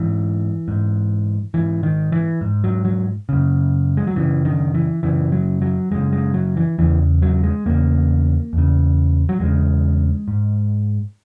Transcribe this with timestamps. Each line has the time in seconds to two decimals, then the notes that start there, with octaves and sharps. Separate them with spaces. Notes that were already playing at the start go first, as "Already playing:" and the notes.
Already playing: G#2 E3
0.68 G#2
1.54 G#2 E3
1.83 D#3
2.12 E3
2.41 G#2
2.64 F#3
2.85 F#3
3.29 F#2 C#3
3.97 G#3
4.07 F#3
4.16 F#2 C#3 E3
4.45 D#3
4.75 E3
5.03 F#2 C#3 E3
5.32 F#3
5.62 F#3
5.91 F#2 C#3 G#3
6.13 G#3
6.34 F#3
6.57 E3
6.78 E2 C#3 E3
7.22 F#3
7.44 G#3
7.66 E2 C#3 A#3
8.53 E2 C#3
9.29 F#3
9.40 E2 C#3 G#3
10.28 G#2